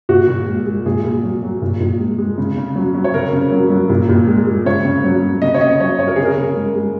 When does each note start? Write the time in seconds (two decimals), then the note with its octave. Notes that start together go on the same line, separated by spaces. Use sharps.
0.09 A#2 F#4
0.28 A#2
0.48 G#3
0.66 G#3
0.86 A#2 G#4
1.05 A#2
1.23 F#3
1.43 F#3
1.62 A#2
1.81 A#2
2.00 G#3
2.18 G#3
2.38 C#3
2.57 C#3
2.76 F#3
2.95 F#3
3.04 C#5
3.14 C#3 A#4
3.33 C#3
3.52 F#3
3.70 F#3
3.89 A#2
4.09 A#2
4.27 G#3
4.47 G#3
4.65 C#3 C#5
4.85 C#3
5.04 F#3
5.22 F#3
5.42 C#3 D#5
5.54 C#5
5.61 C#3 D#5
5.80 F#3 C#5
5.99 F#3 C#5
6.07 A#4
6.16 C#3 G#4
6.25 A#4
6.38 C#3
6.56 G#3
6.75 G#3